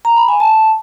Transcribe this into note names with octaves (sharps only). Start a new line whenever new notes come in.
A#5
B5
G#5
A5